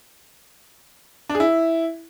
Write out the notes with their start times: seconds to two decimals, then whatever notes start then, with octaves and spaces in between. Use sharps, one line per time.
1.29 D4
1.35 G#4
1.40 E4